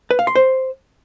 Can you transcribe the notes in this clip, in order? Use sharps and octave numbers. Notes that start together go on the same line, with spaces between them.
B4
F5
C6
C5